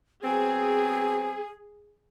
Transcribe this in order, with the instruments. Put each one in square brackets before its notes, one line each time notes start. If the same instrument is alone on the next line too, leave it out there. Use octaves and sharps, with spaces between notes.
[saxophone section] F#3 B3 C4 [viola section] G#4 [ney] G#5